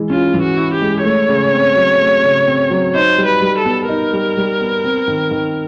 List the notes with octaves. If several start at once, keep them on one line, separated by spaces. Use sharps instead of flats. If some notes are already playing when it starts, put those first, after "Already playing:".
Already playing: E3 G#3 E4
C#4 F4
E3
F#4
E4
G4
G#3
A3 C#5
C#3
C4
F#3
A3
C#3
C4
F#3
D#4 C5
G3
B4
G3
A4
B3
D#4 A#4
G3
G3
B3
C4
D#3
D#3